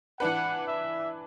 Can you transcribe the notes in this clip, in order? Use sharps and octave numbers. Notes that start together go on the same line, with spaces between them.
E3 D4 B4 F#5
E5